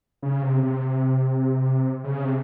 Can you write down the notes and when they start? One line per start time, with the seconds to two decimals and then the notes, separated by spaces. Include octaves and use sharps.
0.23 C#3
0.42 C3
0.63 C3
2.04 C#3
2.24 C3